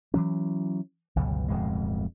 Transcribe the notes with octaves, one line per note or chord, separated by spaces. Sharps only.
E3 F#3 C#4
G1 C#2 B2 F#3
D1 F2 B2 G#3